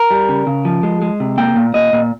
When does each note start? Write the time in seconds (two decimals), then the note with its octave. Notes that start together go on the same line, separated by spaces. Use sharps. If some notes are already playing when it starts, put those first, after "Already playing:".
Already playing: A#4
0.11 G3
0.29 C#3
0.47 C#3
0.65 F3
0.83 G#3
1.02 G#3
1.20 C3
1.38 A#3 G5
1.56 A#2
1.74 A#2 D#5
1.93 A#2